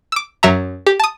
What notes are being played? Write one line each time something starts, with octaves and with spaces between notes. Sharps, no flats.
D6 E6
F#2 F#3 E5 A#5
G4
A5 D#6